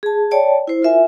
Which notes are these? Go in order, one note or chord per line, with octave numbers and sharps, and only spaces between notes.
G#4 A5
C#5 D5 G5 A5
E4 C5
F4 A#4 E5 G#5